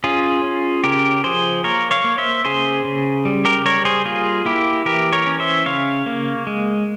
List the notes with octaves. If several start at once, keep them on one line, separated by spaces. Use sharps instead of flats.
C#4 F4 G#4
C#4
C#3 G4 A#4
F3 G#4 C5
A#3 A#4 C#5
C#5 F5
A#3
C5 E5
C#3 G#4 C5
C#3
G3
G4 A#4
G3 A#4 C#5
G#4 C5
A#3 F4 G#4
A#3 E4 G4
E3 G4 A#4
A#4 C#5
C#4
C5 E5
C#3 C#5 F5
A#3
G#3